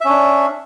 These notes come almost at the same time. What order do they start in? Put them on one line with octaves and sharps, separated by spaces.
E5 C#4 D4